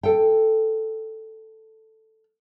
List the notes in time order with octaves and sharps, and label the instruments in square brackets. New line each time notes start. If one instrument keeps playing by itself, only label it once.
[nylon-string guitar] A4 G5